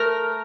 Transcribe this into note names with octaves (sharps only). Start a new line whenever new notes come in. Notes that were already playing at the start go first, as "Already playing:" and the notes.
Already playing: A3 A#4